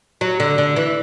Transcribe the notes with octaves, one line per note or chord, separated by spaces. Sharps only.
F#3
D3
D3
E3